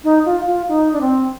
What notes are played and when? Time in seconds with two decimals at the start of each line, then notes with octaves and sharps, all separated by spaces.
0.04 D#4
0.26 F4
0.47 F4
0.68 D#4
0.93 D4
1.01 C4